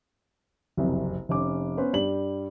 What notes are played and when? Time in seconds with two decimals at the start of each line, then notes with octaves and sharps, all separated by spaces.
0.77 F#1 C2 F2
1.29 F1 C#4 D6
1.77 B3 C#4 B4 C5
1.93 G2 G3 F#7